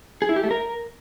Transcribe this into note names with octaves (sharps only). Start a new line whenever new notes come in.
G#4
E4
G4
A3
A#4